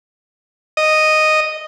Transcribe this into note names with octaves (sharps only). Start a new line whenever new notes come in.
D#5